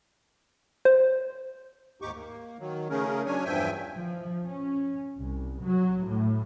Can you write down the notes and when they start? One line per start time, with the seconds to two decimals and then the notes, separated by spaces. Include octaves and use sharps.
0.85 C5
2.02 D#2 G#2 D#4 G4 C#6 D6
2.15 A#3
2.60 D#3 F#3
2.90 C#3 A3 C#4 G#4 A#4
3.26 F#3 C#4 D4 C#5 G#5
3.45 E2 G2 F3 E5 G5 G#5
3.97 F3
4.44 C#4
5.18 C2
5.62 F#3
6.05 A2